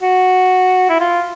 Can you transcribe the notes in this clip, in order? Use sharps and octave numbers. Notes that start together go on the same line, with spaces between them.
F#4
E4
F4